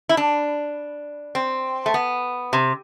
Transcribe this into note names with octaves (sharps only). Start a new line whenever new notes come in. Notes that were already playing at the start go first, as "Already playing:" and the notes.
E4
D4
C4
A3
B3
C3